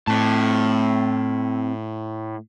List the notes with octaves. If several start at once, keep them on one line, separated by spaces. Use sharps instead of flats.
A2 C4 A5